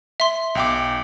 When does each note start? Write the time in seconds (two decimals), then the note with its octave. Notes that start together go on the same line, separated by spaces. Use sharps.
0.20 E5 C6
0.55 B1 G5 D6